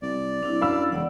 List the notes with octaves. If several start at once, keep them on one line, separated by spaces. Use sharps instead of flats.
C2 D5
C2 D4 E4
F#2 F5 B5 E6
E1 C#3 D5 F#5